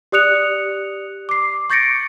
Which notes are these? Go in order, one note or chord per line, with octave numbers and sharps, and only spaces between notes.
G4 D5 D#6 F#6 C#7 F7
D6 C7
C#6 G6 A6 A#6 C#7 D7